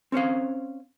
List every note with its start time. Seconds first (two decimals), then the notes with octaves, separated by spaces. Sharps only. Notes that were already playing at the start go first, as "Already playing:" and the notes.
0.12 C4 C#4 C5 F5